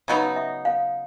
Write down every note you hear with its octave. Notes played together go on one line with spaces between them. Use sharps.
C#3 F#3 B3 D#4 D#5
E5
F5